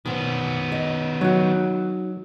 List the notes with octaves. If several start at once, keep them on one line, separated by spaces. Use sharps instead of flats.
B2 D#3 B3 C4
D#5
F#3 D#4 F#4